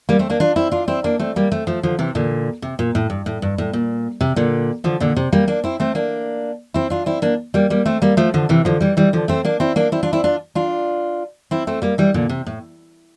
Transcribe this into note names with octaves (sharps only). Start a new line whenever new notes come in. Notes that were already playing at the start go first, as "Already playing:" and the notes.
G3 A#3
A3 C4
A#3 D4
D4 F4
C4 E4
D4 F4
C4 E4
A#3 D4
A3 C4
G3 A#3
A3 C4
F3 A3
D3 F3
C3 E3
A#2 D3
C3
A#2
A2
G2
A2
G2
A2
A#2
C3
A#2 D3
D3 F3
A#2 D3
C3
G3 A#3
A#3 D4
C4 E4
A3 C4
A#3 D4
C4 E4
D4 F4
C4 E4
A#3 D4
G3 A#3
G3 A#3
A3 C4
G3 A#3
F3 A3
D3 F3
C3 E3
D3 F3
E3 G3
E3 G3
D3 F3
A3 C4
A#3 D4
C4 E4
A#3 D4
C4 E4
D4 F4
C4 E4
D4 F4
D4 F4
C4 E4
A3 C4
G3 A#3
E3 G3
A#2 D3
C3
A2